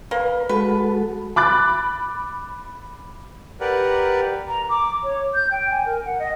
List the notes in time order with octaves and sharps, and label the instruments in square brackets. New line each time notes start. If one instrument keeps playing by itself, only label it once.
[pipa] A#3 [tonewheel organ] B4
[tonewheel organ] G#3 F#4 A4 [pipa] B4
[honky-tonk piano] B5 D6 F#6 A6
[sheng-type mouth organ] G4 A#4 B4 D5 F#5
[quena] A#5
D6
C#5
G6
G5
G#5
A#4
F#5
D#5